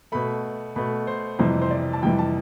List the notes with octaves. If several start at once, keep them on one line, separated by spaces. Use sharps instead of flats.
B2 A3 B5
B2 A3 B5
C5
F2 C3 E3 G3 C5
C5
D5
A5
F2 C3 E3 G3 G5
A5